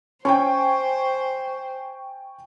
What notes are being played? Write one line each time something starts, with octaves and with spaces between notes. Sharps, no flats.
C#4 C5 G5 G#5 C#6